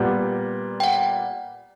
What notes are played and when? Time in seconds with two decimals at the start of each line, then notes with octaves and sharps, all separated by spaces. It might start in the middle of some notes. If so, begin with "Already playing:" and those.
Already playing: A#2 G3 B3
0.80 G5
0.84 F#5